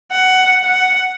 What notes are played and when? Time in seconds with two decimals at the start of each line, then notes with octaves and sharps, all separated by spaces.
0.11 F#5
0.64 F#5